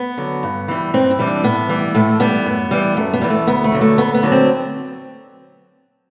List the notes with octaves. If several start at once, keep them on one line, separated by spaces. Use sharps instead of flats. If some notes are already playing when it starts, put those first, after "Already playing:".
Already playing: B3
D3 F#3
G2
E3 G3
G2 C4
E4
E3 G3
D4
A2 B3
E3 G3
A2 A3
E3 G3 B3
F#2
E3 G3
F#2 A3
B3
E3 G3
A3
D2 B3
A3
D3 F#3
A3
D2 B3
B3
D3 F#3
C4